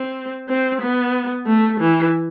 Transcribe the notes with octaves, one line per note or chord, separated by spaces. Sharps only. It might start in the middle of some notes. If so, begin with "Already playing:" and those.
Already playing: C4
C4
B3
A3
E3